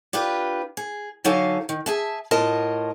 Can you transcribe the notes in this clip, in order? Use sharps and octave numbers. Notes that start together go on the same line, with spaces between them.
D4 F4 G4 B4
G#4
D3 F#3 D#4 A4 F5 G#5
D#3
G#4 E5 A5
A2 B3 F4 A#4 D#5 A5